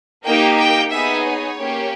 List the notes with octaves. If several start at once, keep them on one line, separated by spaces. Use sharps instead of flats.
A#3 D#4 G4 G5
G5
B3 D#4 G#4 E5
C#5
A#3 C#4 G4